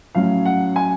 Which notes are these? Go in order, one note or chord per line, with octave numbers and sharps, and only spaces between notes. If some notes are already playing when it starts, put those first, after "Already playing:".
A2 F#3 C#4 F5
F#5
G#5